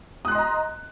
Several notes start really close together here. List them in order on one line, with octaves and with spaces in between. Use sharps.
D#6 F#6 C6 D#5 A#5